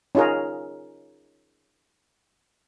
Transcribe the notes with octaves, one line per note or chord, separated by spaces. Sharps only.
C#4 D#4 F4 G#4 A#4